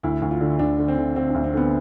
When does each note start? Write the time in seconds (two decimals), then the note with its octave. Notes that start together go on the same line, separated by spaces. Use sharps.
0.03 D2 E4
0.22 D2
0.31 F4
0.41 D3
0.59 D2 D4
0.79 D3
0.88 C4
0.97 D3
1.16 D3 C4
1.30 D2 D4
1.44 C4
1.54 D3 B3